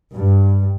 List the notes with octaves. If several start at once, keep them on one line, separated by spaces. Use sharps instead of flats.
G2